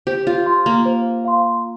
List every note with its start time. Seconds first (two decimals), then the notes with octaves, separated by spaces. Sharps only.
0.07 G4 C5
0.27 F4
0.46 F5 C6
0.66 A#3
0.85 C5
1.25 F5 C6